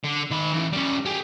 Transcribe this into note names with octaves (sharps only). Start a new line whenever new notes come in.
D3
D#3 B5
A2 E3
G3 C#4
G4 G#4